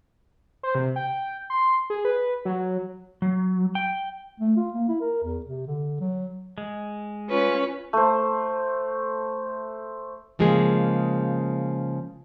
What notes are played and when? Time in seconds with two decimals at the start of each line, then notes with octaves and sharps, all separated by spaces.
0.63 C5
0.75 C3
0.96 G5
1.50 C6
1.90 G#4
2.05 B4
2.45 F#3
3.22 F#3
3.75 G5
4.40 A3
4.57 F4
4.73 A#3
4.88 E4
5.01 A#4
5.24 E2
5.46 C3
5.67 D3
6.00 F#3
6.58 G#3
7.29 C#4 F4 B4
7.93 A3 C5
10.39 C#3 F3 G#3 A#3 G#4